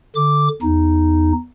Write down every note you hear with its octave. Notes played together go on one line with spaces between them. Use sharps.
D3 D6
E2 D#4